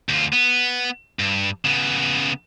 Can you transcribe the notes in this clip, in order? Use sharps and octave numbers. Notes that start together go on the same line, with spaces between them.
D2 F4
B3
G2
C#3 B3